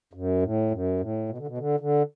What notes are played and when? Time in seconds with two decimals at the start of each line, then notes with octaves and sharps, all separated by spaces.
0.13 F#2
0.42 A2
0.71 F#2
1.00 A2
1.29 B2
1.38 D3
1.47 B2
1.58 D3
1.80 D3